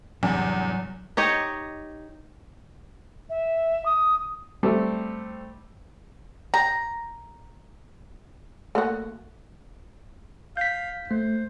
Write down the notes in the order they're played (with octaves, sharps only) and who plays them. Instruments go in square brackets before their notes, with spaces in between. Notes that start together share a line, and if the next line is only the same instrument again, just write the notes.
[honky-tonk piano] E2 [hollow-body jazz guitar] G#2 C3 D4 [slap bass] F#3 G3
[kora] D#4 G4 C#5 D#5
[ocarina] E5
D#6
[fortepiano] G3 A3 C4
[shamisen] G4 [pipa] A#5
[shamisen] A3 A#3 F#4
[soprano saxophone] F5 [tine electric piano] G6 B6
[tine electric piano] A3 [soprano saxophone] C5